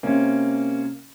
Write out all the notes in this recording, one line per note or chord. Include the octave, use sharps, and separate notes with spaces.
C3 A#3 C#4